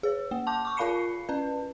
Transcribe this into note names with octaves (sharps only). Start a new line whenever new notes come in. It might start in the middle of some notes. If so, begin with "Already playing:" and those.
G#4 C#5
A#3
A5 D6 G6
C#6 D6
F4 A#4 F5 B5 C7 C#7
C#4 B4